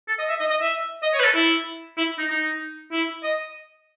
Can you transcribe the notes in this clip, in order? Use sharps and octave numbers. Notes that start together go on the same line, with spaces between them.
A4
D#5
E5
D#5
D#5
E5
D#5
C#5
B4
A4
E4
E4
D#4
D#4
E4
D#5